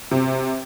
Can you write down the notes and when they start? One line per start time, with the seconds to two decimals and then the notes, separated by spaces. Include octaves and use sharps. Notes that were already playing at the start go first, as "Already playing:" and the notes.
0.11 C3